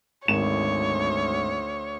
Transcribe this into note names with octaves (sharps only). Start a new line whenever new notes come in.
G#1 D2 C#5 E7